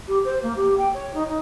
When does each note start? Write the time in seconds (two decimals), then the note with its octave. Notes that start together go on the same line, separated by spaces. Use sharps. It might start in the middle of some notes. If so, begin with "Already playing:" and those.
0.07 G4
0.24 C5
0.42 A#3
0.56 G4
0.77 G5
0.93 C#5
1.13 D#4
1.27 D#4